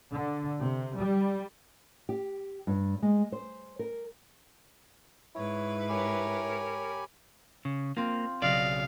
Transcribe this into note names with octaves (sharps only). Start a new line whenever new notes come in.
D3
C3
G3
G4
G2
G#3
C5
A#4
G#2 E4 B4 C#5
G4 A#4 C#5 G#5 B5
C#3
A#3 C4 F4
B1 C#3 D5 D#5 F5